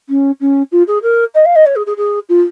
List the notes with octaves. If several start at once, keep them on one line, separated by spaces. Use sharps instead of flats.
C#4
C#4
F4
G#4
A#4
D#5
F5
D#5
C#5
G#4
G#4
G#4
F4